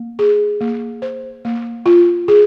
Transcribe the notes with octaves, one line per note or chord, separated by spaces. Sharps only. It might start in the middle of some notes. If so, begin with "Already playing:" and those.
Already playing: A#3
G#4
A#3
C5
A#3
F4
G#4